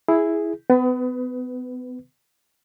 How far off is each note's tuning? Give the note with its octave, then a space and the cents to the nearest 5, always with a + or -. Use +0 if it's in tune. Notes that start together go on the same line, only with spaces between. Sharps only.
E4 +0 G#4 +0
B3 +35 B4 +15